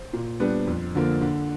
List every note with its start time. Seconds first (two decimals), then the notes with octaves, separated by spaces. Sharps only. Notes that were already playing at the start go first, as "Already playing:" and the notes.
Already playing: C5
0.13 A#2
0.40 G3 B3 D4
0.67 F2
0.95 D3 F3 A#3
1.21 D3